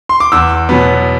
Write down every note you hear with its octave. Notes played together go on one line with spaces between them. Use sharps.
C6
D6
E2 E6
B2 F#3 B3